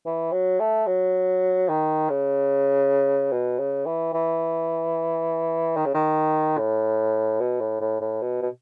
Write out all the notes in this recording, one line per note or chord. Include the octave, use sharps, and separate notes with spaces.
E3
F#3
A3
F#3
D#3
C#3
B2
C#3
E3
E3
D#3
C#3
D#3
A2
B2
A2
A2
A2
B2
B2